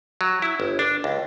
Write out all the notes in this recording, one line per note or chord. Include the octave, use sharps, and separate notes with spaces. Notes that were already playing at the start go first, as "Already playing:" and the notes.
F#3
E4
G1
D4
C#2